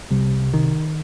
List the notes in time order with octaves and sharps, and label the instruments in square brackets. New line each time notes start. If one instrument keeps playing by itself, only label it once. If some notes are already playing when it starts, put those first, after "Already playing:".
[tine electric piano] C2 C3 [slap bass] G3
[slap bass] D#3